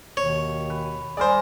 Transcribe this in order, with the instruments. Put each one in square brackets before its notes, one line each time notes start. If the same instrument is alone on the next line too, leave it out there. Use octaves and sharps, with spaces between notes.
[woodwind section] D#2 B2 D#3 [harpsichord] C#5
[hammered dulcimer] B4
[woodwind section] G3 [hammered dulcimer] G#4 A#4 [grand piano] C5 D5